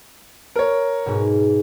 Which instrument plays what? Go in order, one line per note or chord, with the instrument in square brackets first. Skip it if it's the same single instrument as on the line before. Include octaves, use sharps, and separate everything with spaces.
[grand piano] A#4 C#5
[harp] G#2 B2